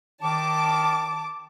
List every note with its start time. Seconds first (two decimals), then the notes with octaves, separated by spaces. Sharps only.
0.22 D#3 A5 D6